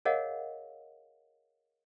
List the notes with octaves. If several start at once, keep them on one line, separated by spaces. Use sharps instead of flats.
G#4 A#4 C#5 D#5 F5 F#5